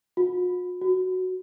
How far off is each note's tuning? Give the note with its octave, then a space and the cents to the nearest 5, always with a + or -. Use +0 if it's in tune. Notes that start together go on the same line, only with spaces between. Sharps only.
F#4 -45
F#4 +0